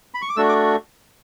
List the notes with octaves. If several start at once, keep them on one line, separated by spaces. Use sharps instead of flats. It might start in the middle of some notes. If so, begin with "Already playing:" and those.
B5
C#6
D6
A3 D4 F#4 E6
D6